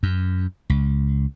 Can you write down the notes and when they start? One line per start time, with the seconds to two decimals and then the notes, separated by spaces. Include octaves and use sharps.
0.03 F#2
0.70 C#2